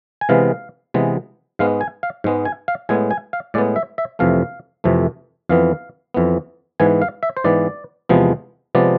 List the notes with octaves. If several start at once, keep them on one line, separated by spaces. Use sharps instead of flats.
G#5
C3 E3 G#3 B3 F5
C3 E3 G#3 B3
G#2 G#3 B3 F5
G#5
F5
G#2 G#3 B3
G#5
F5
A2 G#3 B3 G#5
G#5
F5
A2 G#3 B3 D5
E5
E5
F2 C3 E3 A3 F5
F2 C3 E3 A3
F2 E3 B3 F5
F2 E3 B3
G#2 E3 B3 G#5
F5
E5
C5
G#2 E3 B3 D5
E2 C3 F3 G#3 B3
C3 F3 G#3 B3 D5